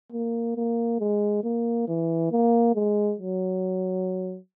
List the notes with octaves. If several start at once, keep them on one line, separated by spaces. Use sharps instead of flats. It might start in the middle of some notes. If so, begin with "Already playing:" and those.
A#3
A#3
G#3
A#3
E3
A#3
G#3
F#3